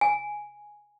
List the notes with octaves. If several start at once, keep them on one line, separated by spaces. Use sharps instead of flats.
G#5